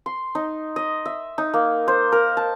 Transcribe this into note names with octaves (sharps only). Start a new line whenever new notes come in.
C6
D#4
D#5
E5
D#4
A#3
C5
A#4
A5